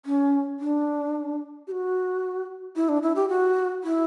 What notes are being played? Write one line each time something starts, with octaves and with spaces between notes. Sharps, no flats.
C#4
D4
G4
F#4
E4
D4
E4
G4
F#4
E4